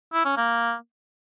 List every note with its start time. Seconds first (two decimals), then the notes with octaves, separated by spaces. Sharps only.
0.13 E4
0.25 C#4
0.37 A#3